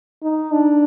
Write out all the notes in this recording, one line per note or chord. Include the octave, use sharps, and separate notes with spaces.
D#4
D4